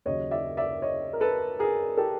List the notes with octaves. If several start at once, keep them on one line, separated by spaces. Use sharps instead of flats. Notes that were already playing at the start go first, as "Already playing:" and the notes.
D#2 C#3 F#3 C#5 D#5
D5 E5
D5 E5
C#5 D#5
A#4
A4 B4
G#4 A#4
G4 A4